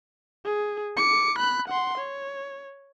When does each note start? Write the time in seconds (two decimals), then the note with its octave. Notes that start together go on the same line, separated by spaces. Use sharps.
0.44 G#4
0.97 D6 C#7
1.38 B5 F#6
1.68 F#5 C6
1.98 C#5